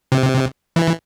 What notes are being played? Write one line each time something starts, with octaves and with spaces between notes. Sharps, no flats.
C3
E3